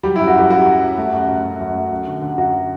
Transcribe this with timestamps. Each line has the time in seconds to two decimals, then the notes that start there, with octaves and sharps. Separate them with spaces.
0.03 F#3 G3 G4
0.16 F#2 E4
0.27 F#4
0.35 F#2 G3 G4
0.50 F#2 F#4
0.66 F#2
0.83 F#2
0.98 A3
1.13 F#2
1.28 F#2
1.44 F#2
1.60 F#2
1.75 A3
1.91 F#2
2.07 D3
2.22 D3
2.38 F#2 F#4
2.53 D3